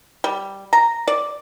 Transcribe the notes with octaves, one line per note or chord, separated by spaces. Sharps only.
G3
A#5
D5